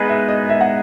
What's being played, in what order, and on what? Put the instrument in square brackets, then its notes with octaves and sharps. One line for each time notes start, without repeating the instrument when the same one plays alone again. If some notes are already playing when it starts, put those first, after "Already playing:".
Already playing: [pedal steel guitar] G#3 B3 D#4 G#4 B4 [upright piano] D#5
[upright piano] E5
D#5
E5
F#5